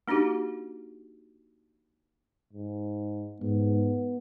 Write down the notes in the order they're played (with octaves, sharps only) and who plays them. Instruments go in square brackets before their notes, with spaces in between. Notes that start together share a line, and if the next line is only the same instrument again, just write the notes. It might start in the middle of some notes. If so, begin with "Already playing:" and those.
[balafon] A#3 D4 D#4 F#4 G4
[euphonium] G#2
[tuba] G#2 [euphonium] B3